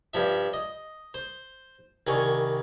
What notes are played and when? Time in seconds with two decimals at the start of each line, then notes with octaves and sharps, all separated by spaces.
0.14 G2 F3 E5
0.53 D#5
1.14 C5
2.07 C2 D#3 G#5 C#6